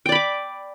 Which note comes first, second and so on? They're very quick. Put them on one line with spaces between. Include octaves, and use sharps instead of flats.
G5 D5 B5 D6